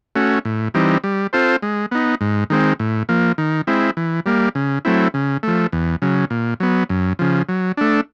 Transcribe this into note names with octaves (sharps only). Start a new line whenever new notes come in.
A3 C#4 F#4
A2
E3 G3 C4 D#4
G3
C4 F4 A4 C5
G#3
B3 D#4
G#2
D#3 G#3 C4
A2
F3 A#3
D#3
G#3 C4 E4
E3
G3 A#3
C#3
F#3 A3 C4 E4
C#3
F3 A3
E2
C#3 F#3
A#2
F#3 B3
F#2
C#3 F3
F#3
A3 D4